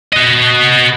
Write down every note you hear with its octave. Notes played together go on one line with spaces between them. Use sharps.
F#4 D#5